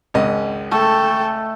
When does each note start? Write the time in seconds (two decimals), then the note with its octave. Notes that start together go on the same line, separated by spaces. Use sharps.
0.14 G#1 C#2 D#5
0.71 A3 A4 G5